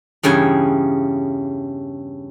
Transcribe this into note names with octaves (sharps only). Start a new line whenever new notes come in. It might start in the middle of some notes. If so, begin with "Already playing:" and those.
E2 G2 C#3 G5 G#5